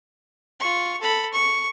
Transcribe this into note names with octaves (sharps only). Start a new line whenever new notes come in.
F4 C#6
A4 B5
C#6